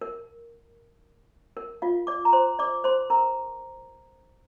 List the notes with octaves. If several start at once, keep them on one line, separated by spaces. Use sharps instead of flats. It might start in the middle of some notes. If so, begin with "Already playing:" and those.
A#4
A#4
F4 F5
D5 D6
A#5
C5 C6
D5 D6
C5 C6
A#4 A#5